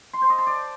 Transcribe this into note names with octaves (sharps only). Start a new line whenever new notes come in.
C6
C5
D#5
A5
D5